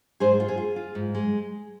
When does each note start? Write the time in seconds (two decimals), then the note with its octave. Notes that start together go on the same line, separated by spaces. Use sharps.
0.20 G#2 G#4 C5
0.40 F4
0.48 G#4
0.58 F4
0.76 F4
0.95 G#2
1.15 G#3